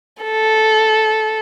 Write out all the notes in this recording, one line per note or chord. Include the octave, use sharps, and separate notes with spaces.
A4